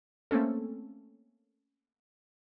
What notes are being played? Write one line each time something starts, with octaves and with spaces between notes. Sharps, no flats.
A3 A#3 C4 C#4 A4